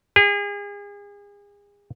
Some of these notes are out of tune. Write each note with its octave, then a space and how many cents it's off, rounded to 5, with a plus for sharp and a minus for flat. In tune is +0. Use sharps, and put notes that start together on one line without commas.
G#4 -35